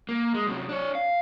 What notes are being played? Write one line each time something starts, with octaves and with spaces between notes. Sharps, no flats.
A#3
G#3
F#2 C3
D4 C#5
F5